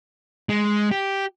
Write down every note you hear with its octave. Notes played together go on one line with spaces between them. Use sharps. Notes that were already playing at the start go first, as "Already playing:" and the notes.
G#3
G4